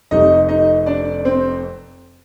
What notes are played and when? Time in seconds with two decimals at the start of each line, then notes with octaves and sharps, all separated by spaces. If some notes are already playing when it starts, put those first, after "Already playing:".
0.11 F1 F2 C3 D#4 D#5
0.49 D#4 D#5
0.86 D4 D5
1.25 C4 C5